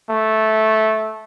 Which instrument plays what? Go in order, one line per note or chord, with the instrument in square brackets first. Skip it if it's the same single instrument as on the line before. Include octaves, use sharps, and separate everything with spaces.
[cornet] A3